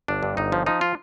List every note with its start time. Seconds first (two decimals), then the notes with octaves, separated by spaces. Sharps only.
0.08 G1 D4
0.23 G2
0.37 G1 D#4
0.52 F3
0.66 F3 D#4
0.81 F4